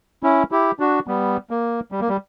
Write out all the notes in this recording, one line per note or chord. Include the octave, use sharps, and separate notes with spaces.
C#4 E4
E4 G4
D4 F#4
G3 B3
A#3
G3
A#3
G3